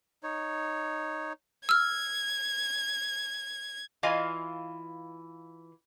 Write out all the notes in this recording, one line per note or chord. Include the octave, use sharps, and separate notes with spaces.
D#4 C#5
E6 F6 G#6
E3 F4 D#5 F5 G#5